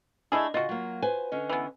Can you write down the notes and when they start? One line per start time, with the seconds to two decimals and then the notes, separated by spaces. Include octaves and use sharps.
0.32 A3 D4 E4 G#4 D#5
0.54 C#3 F4 F#4 D#5
0.69 F#3 A#3
1.02 B4 C5 G#5
1.32 D3 C#4 D#5
1.49 E3 B3